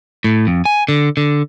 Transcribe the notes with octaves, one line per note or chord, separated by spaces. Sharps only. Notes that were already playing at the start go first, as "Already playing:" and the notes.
A2
F2
G#5
D3
D3